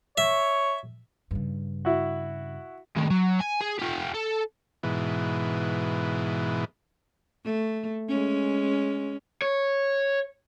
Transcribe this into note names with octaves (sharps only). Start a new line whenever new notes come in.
C#5 E5
G2 C#3
E4 F#4
A2 D#3
F#3
G#5
G#4
F4 G4
A4
G#2 B2 E3
A3
G#3 C#4
C#5